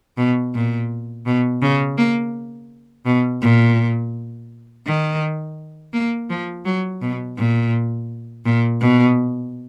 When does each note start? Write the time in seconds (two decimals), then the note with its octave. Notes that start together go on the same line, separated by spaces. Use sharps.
0.18 B2
0.55 A#2
1.26 B2
1.62 C#3
1.98 A#3
3.06 B2
3.42 A#2
4.86 D#3
5.93 A#3
6.30 F3
6.66 F#3
7.02 B2
7.38 A#2
8.46 A#2
8.81 B2